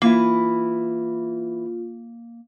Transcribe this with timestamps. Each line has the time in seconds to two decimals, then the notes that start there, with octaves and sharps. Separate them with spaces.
0.02 E3 A#3 E4 F4